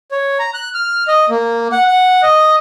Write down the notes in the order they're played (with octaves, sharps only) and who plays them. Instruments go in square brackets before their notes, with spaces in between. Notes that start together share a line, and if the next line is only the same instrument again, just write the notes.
[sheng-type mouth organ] C#5
A#5
F#6
F6
D#5
A#3
F#5
F#5
D#5